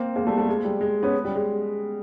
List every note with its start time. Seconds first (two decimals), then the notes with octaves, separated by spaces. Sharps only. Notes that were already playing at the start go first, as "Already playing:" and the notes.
Already playing: A#3 C4
0.16 G#3 A#3
0.27 G3 A3
0.37 G3 A3
0.49 G#3
0.65 G3
0.81 G#3
1.03 B3 C#4
1.25 G3
1.35 G#3